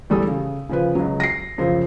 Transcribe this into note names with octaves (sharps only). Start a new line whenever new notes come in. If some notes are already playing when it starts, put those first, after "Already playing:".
E2 G3 A4 D#6
C#3
C#3 F3 B4
C#2 F#3
A#6 C7
F#2 C#3 F3